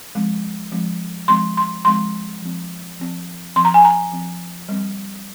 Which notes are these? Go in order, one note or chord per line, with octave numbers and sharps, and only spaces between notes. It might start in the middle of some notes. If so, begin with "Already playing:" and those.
F3 G#3 C4
F3 G#3 C4
F3 G#3 C4 C6
C6
F3 G#3 C4 C6
F3 C4
F3 C4
F3 C4 C6
A#5
G#5
A#5
F3 C4
G3 C4